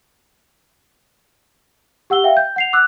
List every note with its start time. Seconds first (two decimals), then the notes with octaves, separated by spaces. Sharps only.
2.10 G4 F#5 E6 G7
2.24 E5 F5 G5
2.37 G6
2.56 F#5 C7 F7
2.73 D6 E6 F#6